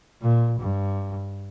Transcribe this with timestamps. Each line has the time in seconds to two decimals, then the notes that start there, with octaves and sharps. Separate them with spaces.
0.22 A#2
0.60 G2